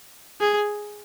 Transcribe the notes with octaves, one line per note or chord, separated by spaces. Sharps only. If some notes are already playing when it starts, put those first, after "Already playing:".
G#4